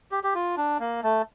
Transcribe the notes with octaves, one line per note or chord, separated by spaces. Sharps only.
G4
G4
F4
D4
A#3
A3